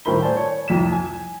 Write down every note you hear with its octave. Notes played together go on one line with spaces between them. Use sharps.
D#1 A2 A#4 C5 B5 G7
C5 D5 G#5 A5
C#5
C2 F2 B6 E7
G#5